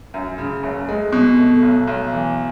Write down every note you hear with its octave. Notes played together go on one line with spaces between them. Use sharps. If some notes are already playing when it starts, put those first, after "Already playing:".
F#2
C#3
F#1
G#3
B2
A3
B1
B1
E3